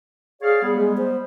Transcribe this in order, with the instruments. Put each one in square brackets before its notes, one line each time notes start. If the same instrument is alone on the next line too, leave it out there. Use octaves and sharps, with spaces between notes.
[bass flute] G#4 [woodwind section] C#5 D5 F5
[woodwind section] G3 B3 [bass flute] G#4
[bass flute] G#3
C5